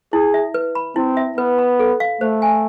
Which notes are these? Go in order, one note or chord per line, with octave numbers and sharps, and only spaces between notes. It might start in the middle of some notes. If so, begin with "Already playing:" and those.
E4 G#4
E5
B4
B5
C4 E4
E5
B3 B4
B5
A4
F5
A3 C5
G#5